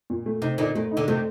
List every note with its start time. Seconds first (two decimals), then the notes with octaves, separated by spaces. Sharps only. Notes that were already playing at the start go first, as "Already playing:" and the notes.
0.10 A#2
0.26 A3
0.42 C3 D#4
0.58 A#2 D3 D#4
0.75 A#2 A3
0.91 D#4
0.97 A#2 D3
1.08 C3 D#3 A3